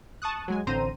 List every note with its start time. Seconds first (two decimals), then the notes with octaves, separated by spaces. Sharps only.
0.22 A5 C#6 D#6 F#6
0.48 F#3 G#3 G#5
0.67 A1 D3 C4 C5 A#5 D#7